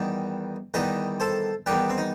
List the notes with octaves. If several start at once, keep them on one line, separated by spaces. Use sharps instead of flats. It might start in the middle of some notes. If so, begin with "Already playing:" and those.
Already playing: E2 D#3 G3
E2 D#3 G3 B4 D#5
A4 C5
E2 D#3 G3 G4 B4
C4
D#4